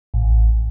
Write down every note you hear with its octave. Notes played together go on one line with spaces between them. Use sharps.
A1